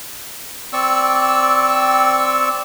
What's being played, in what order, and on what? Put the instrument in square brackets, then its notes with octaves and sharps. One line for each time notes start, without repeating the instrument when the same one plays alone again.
[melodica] C4 D5 C#6 E6